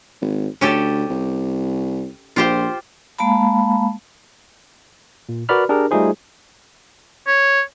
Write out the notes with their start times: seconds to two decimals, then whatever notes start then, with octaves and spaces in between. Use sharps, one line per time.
0.22 G#1
0.61 D2 C#4 G4 A4
1.10 C2
2.36 A#1 F4 G4 C5
3.19 G#3 A#3 F5 A5 B5
5.29 A#2
5.49 F#4 A#4 B4 D5 B5 F6
5.69 D4 G4 G#4 A#4
5.91 G3 A3 D#4 F4 G#4 C5
7.27 C#5